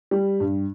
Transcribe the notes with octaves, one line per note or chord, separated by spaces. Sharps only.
G3
G2